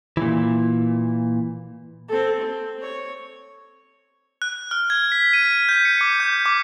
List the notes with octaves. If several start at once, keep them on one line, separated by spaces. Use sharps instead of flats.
A#2 E3
C4 A4
C4
C#5
F#6
F6
G#6
B6
D#7
G6
C#7
D6
G6
D6